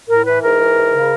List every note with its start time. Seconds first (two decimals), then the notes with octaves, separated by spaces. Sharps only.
0.09 A2 A#4
0.26 E3 B4
0.43 G#2 A#4
0.60 E3
0.76 G#2
0.94 C#3